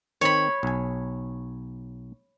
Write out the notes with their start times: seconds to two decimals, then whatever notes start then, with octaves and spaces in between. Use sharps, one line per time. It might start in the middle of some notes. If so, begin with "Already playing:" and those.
0.21 D#3 C4 C#5 B5
0.63 B1 G#5